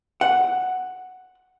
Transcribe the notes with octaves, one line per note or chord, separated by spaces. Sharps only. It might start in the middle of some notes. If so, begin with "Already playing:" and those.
F#5